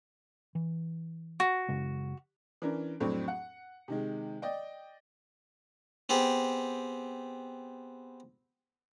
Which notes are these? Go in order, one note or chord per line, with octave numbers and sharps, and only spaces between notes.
E3
F#4
F#2 C#3 G#3
E3 C#4 D4 A#4
F2 A2 F#3 C4 D4
F#5
C3 D#3 G#3
D5 D#5 G5
B3 C4 G4 G#4